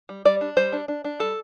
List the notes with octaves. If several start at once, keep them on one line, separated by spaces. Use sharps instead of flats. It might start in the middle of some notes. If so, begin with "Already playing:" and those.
G3
G3 D5
D4
G3 C5
D4
D4
D4
G3 A4